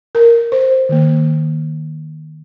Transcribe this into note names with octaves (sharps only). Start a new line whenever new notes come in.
A#4
C5
D#3 A#3